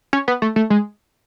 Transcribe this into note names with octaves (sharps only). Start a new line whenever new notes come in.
C#4
B3
A3
A3
G#3